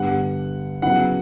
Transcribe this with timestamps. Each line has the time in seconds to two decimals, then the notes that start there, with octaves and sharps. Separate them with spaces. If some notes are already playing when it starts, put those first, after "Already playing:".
Already playing: G2 D3 G3 B3 F#5
0.82 C#3 F#3 B3 E4 F#5